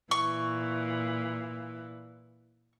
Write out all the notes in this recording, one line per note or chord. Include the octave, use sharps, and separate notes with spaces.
A#2 E3 C#6